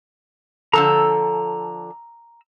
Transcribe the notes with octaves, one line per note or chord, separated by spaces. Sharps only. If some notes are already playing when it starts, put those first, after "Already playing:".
D3 F3 A4 A#5 E6